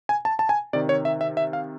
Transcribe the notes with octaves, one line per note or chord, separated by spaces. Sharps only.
G#5
A5
A5
G#5
C3 D#3 D5
C#5
E5
E5
E5
F5